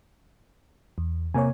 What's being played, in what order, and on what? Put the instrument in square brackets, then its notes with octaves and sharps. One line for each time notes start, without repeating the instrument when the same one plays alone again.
[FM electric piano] E2
[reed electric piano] C3 A#3 [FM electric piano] C#5 G#5